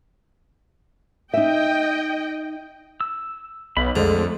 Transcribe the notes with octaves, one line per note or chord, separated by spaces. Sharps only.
D#4 D#5 E5 G5
E6
B1 B5
F2 D3 G#3 A3